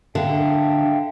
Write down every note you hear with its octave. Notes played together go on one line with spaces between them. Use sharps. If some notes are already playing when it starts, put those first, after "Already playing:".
D3 E5 F5 G5